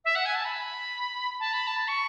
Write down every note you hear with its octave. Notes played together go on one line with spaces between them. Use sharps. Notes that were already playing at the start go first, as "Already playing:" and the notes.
E5
F#5
G#5
A5
B5
A5
B5
A5
C#6